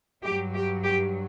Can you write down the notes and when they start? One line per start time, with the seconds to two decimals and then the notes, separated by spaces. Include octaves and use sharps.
0.24 G2 F#3 G4
0.54 G4
0.84 G4